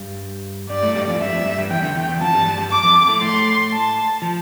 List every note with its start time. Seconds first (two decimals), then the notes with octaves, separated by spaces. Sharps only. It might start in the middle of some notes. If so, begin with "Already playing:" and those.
Already playing: G2 G3
0.70 G2 G3 D5
0.83 A2 A3
0.95 G2 G3
1.08 F2 F3
1.15 A3
1.20 G2 G3 E5
1.32 F2 F3
1.46 G2 G3
1.58 G2 G3
1.70 E2 E3 G5
1.83 D3
1.96 E2 E3
2.08 E2 E3
2.21 F2 F3 A5
2.33 G2 G3
2.45 G2 G3
2.58 G2 G3
2.71 D6
2.83 F2 F3
3.09 A2 A3
3.21 A2 A3 C6
3.72 A5
4.22 F3